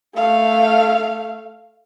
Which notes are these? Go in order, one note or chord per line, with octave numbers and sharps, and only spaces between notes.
A3 F5